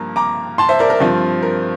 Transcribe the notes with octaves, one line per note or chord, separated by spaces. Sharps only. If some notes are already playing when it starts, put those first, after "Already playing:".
Already playing: G2 F3 A#3 A#5
A#5 D6
A5 C6
C5 E5
A#4 D5
A#4
G2 F3 C4 F4
A#4